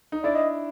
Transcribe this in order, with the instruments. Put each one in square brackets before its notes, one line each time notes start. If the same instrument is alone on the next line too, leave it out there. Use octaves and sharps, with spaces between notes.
[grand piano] D#4
[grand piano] D4 E4 [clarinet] D5
[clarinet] D#5